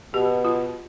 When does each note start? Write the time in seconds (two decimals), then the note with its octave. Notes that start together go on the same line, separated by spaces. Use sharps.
0.14 B2 G4
0.45 F4